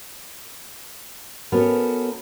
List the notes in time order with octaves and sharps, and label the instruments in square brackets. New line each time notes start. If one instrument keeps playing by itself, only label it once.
[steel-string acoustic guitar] B3 C#4 F#4 A4 A#4